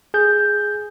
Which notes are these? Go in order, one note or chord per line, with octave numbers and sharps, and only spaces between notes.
G#4 G6